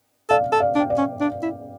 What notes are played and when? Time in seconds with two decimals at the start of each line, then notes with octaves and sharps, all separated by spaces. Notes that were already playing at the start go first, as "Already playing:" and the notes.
0.30 A4 D5 F5
0.52 A4
0.60 D5 F5
0.75 D4
0.79 G5
0.90 D5 F5
0.98 C#4
1.21 D4
1.42 E4